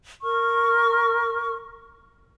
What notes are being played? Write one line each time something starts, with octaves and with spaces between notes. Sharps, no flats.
A#4 C#6 F6